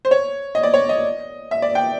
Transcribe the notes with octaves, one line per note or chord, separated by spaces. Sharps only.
C5
C#5
D#5
D5
C#5
D#5
E5
D5
G5